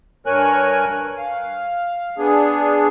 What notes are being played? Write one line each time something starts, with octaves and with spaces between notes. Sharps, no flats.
G2 A#4 C#5 G#5 F#6
F5
B3 D4 G#4